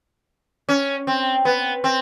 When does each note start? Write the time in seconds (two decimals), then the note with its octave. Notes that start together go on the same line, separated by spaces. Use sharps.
0.69 C#4
1.07 C4
1.45 B3
1.84 C4